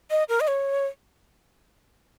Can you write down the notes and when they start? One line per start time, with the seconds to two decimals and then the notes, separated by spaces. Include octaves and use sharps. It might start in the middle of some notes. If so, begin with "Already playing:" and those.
0.11 D#5
0.29 A#4
0.40 D#5
0.48 C#5